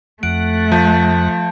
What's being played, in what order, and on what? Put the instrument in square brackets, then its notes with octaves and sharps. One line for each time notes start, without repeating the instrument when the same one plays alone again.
[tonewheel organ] F2 F#5 [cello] A3 [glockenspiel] D7
[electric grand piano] F3 [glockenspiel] A5 G6